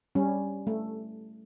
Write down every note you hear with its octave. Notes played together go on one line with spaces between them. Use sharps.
G3 C#4
A3